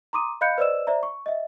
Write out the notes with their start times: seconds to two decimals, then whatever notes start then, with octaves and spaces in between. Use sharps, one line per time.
0.13 A#5 C6 D6 D#6 D#7
0.41 D#5 F5 B5 F#6 G6 C#7
0.58 B4 C5 D5 D#5 E6 E7
0.87 C5 D5 E5 A#5
1.03 C#6
1.26 D#5 E5